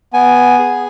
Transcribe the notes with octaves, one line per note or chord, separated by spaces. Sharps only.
B3 G#5
G#4